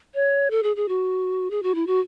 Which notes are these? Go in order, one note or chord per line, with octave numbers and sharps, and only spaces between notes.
C#5
A4
G#4
G#4
F#4
G#4
F#4
E4
F#4